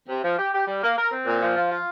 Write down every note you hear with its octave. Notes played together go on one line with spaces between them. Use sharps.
C3
F3
G4
G4
G3
A#3
A#4
C4
A#2
F3
F4
F4